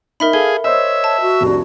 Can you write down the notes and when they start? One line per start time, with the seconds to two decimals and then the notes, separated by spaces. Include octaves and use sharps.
0.20 D#4 A#4 E5 B5
0.33 G#4 A4 F5 G7
0.64 C5 C#5 D#5 E5 E6
1.04 A5
1.21 F#4
1.41 F1 C2 D4